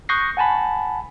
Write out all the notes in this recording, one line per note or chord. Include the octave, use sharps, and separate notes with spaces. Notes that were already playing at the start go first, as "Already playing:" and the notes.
C#6 D#6 F#6 G6 A#6 C7
F#5 G#5 A5 B5